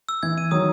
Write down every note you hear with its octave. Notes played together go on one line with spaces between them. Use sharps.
E6
E3 G#6
D#7
D#3 F#3 D#6